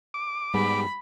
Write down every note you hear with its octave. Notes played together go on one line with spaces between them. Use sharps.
D6
G#2 G3 B3 G#4 B5